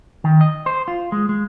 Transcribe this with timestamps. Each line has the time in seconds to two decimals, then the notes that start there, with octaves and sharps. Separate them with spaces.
0.24 D#3
0.41 D#5
0.66 C5
0.88 F4
1.12 G#3
1.29 G#3